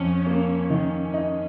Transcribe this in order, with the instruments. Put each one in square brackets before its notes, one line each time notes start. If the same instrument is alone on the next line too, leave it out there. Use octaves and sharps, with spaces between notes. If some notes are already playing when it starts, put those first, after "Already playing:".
Already playing: [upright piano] F2 [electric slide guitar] C#4
[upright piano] A#3
D#3
D#4